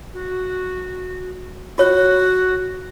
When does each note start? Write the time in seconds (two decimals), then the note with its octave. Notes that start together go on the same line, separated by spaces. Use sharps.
0.14 F#4
1.78 F4 F#4 C#5